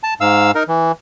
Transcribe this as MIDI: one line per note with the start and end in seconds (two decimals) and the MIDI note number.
0.03 0.14 81
0.21 0.51 44
0.21 0.51 77
0.21 0.51 88
0.55 0.63 63
0.55 0.63 70
0.68 0.92 52